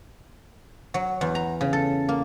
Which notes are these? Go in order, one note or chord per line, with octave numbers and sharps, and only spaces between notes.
F#3
E2
A#5
C#3
A4
A#3